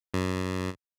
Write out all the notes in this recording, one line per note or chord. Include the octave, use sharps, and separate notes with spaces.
F#2